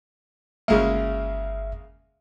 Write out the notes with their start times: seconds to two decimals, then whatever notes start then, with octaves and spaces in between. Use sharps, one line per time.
0.68 G1 C#3 G#3 A#3 E5